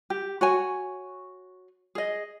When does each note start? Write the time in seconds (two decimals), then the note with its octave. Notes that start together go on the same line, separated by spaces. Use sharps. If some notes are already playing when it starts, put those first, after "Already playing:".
0.10 G4
0.41 F#4 C#5 G#5
1.95 G#4 D#5